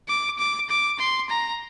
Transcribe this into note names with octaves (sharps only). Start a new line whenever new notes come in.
D6
D6
D6
C6
A#5